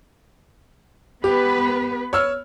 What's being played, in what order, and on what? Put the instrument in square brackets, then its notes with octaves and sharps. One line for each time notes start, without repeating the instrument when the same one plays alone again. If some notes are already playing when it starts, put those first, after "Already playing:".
[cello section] B3 B4 [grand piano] G4
[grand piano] C#5 E6 F6